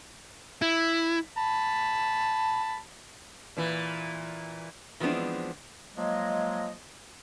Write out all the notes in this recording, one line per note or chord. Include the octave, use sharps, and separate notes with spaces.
E4
A5 B5
A#2 E3
E3 F3 G#3 B3 C4 D4
F3 F#3 G#3 A#3 D#5